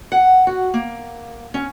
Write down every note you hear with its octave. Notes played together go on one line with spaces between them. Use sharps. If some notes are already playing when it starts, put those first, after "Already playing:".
F#5
F#4
A#3
C#4